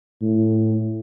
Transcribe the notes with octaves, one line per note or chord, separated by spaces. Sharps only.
A2